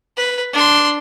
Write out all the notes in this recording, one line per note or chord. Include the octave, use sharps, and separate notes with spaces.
B4
D4 C6